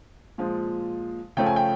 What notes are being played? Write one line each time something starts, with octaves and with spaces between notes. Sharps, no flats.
A#2 F3 G#3
C#3 F3 A3 C#4 G5
G#5
G5